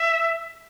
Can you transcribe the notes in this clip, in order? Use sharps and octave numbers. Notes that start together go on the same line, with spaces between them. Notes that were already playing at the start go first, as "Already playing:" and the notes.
Already playing: E5